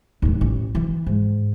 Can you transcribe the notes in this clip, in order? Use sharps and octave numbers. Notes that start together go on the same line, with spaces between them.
D#2 A2
A1
E3
G#2